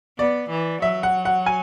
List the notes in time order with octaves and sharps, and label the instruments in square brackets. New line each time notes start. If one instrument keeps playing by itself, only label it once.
[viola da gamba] B3 [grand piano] D5
[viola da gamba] E3
[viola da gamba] F#3 [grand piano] E5
[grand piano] F#5
F#5
G#5